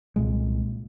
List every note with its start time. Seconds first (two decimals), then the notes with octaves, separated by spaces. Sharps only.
0.16 C2 A#2 G#3